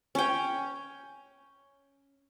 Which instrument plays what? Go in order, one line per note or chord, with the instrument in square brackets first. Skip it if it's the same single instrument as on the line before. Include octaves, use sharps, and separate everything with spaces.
[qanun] C#4 G5